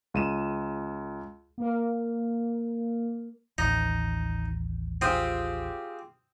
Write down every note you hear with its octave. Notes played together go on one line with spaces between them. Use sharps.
C#2 D#7 E7
A#3 A#4
A1 D#2 D#4
C4 F4 G4 G#4 D#6